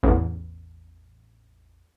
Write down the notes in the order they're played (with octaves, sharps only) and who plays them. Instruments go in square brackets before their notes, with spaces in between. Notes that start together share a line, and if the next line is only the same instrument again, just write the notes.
[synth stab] A1 E2